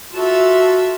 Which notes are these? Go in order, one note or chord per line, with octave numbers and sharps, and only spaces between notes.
F4 F#4 A4 E5